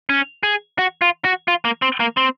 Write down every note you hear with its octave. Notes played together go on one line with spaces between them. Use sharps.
C#4
G#4
F#4
F4
F#4
F4
A#3
C4
A#3
C4